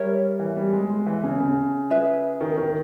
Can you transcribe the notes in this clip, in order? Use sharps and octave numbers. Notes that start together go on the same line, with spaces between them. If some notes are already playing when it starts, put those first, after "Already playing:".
Already playing: G3 A#4 C#5 E5
E3
G3
G#3
G#3
E3
C#3
C#3
G#4 B4 E5
D#3
D#3